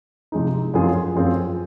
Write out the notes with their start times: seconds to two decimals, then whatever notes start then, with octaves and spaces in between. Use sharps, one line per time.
0.32 C3 F3 G#3 D#4
0.74 F#2 F3 C4 F4 G#4
1.15 F#2 F3 C4 F4 G#4